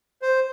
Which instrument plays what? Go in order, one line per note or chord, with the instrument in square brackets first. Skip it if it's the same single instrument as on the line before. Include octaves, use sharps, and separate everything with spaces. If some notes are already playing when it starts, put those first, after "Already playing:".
[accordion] C5